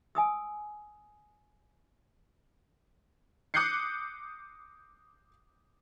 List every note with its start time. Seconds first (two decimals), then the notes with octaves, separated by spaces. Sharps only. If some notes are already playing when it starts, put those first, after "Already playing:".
0.15 G#5 D#6 E6
3.54 D6 D#6 F#6 G6 C7 C#7